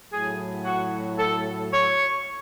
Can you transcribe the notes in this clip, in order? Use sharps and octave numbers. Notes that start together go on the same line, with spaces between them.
A2 F#3 G#4
F#4
A4
C#5